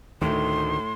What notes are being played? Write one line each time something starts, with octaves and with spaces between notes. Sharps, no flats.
D2 A2 D#3 A3 C6